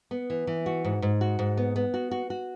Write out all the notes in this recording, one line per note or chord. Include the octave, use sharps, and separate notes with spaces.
B3
E3
E3
F#4
G#2
G#2
F#4
G#2
B3
B3
F#4
F#4
F#4